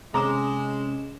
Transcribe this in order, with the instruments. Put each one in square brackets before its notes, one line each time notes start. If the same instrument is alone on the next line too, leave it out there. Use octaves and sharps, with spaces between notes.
[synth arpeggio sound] C3 C#4 E7 [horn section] G#3 [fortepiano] A#5 D6 D#6